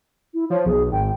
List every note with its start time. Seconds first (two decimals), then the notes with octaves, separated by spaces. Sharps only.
0.34 E4
0.50 F3 C#5
0.66 B1 G#4
0.92 G#1 G5